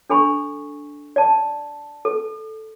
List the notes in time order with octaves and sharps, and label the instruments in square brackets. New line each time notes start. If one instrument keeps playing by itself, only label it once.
[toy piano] D4 A4 G#5 B5 C#6
D5 A5
A4